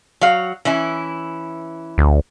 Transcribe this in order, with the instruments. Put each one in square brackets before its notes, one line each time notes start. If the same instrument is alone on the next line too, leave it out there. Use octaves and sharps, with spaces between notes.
[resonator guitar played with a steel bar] F#3 F5
E3 C#4 E4
[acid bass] D2